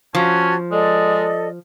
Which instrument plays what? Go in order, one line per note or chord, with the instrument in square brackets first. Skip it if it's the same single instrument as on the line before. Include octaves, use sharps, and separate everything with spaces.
[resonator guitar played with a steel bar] F3 [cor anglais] C#4 [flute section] F#4 A5 G#6
[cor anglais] G#3 [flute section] A4 D5 D#5